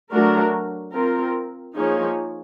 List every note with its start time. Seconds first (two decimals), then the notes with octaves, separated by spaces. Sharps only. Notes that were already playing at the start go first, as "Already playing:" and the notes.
0.12 F#3 A3 D4 F#4 A#4
0.94 C4 F4 A#4
1.76 F3 A#3 D#4 G#4 C#5